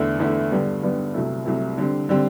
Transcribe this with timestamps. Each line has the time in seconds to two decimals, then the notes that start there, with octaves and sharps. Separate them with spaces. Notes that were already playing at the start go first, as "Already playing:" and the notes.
Already playing: E2 D3 A3 E4
0.19 E2 D3 A3 E4
0.51 G2 D3 G3 B3
0.83 G2 D3 G3 B3
1.14 C2 C3 F#3 A3 E4
1.45 C2 C3 F#3 A3 E4
1.78 D3 G3 C4
2.09 D3 G3 C4